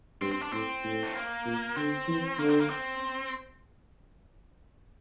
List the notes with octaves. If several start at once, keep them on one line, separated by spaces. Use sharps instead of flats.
G2 C4
C4
D4
A2 C4
A2
A3
A#3
A#2
D3 C4
E3
D3 A#3
C4
A#3
C4